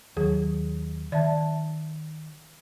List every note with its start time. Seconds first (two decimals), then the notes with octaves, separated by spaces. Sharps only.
0.17 D#2 F#3 G#4
1.12 D#3 D5 E5 A5